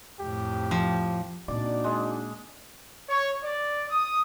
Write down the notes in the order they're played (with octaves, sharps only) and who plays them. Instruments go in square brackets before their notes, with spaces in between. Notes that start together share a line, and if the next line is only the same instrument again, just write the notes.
[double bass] F2 A2 [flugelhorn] G4
[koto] F3
[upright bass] A#2 C4 [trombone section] D4 D#4 F#4 [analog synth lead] D5 [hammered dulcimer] D6
[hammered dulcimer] G#3
[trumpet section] C#5
D5
D#6